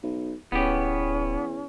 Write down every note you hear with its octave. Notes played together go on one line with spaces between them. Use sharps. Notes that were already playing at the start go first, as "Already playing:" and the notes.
B1
D1 E2 B3 C#4 G4